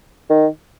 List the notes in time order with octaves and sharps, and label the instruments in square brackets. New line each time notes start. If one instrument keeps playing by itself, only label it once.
[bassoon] D#3